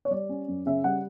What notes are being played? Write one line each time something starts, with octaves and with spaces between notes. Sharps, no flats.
C#5
G3 D5
C#4
F#2
C#3 E5
G3 F#5